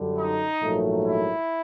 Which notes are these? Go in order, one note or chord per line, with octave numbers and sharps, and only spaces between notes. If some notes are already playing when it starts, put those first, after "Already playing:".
Already playing: F#2 D3 G3
D#4
A#1 G#2 D#3 F#3 A3
E4